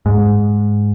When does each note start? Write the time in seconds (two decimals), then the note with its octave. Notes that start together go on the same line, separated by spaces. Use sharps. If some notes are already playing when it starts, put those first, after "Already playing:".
0.06 G#2